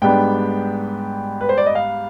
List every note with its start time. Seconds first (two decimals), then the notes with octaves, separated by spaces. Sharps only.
0.02 G#2 G3 B3 D4 G5
1.41 B4
1.49 C5
1.58 D5
1.66 D#5
1.75 F5